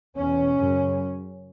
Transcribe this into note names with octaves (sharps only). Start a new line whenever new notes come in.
E2 B2 C#4
F#2 C#3